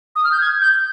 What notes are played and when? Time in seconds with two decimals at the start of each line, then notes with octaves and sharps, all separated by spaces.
0.16 D#6
0.24 F6
0.32 G6
0.41 G#6
0.62 G6